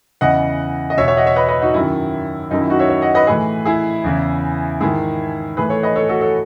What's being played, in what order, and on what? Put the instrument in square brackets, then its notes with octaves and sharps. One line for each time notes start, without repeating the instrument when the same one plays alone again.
[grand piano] E2 C#3 E3 D#5 F#5
D#5
E2 B2 C#5 E5
C#5 E5
D#5 F#5
C#5 E5
B4 D#5
B4 D#5
D#4 F#4
F#2 D#3 E4
F#2 D#3 D#4
E4
D#4 F#4
C#5 E5
C#5 E5
D#5 F#5
B4 D#5
A2 E3 G#4 B4
E4 G#4
E2 C#3 E3
G#2 D#3 E4 G#4
A2 E3 G#4 B4
A4 C#5
B4 D#5
A4 C#5
F#4 A4
A4 C#5